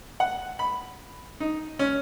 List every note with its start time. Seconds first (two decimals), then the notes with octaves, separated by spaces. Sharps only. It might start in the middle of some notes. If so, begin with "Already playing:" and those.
0.20 F#5
0.59 B5
1.40 D#4
1.79 C#4